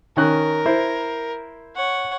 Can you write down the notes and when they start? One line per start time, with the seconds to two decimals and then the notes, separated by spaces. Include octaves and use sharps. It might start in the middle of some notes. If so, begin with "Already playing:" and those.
0.17 D#3 C#4 A#4 F#6
0.66 E4 C5
1.76 C#5 F#5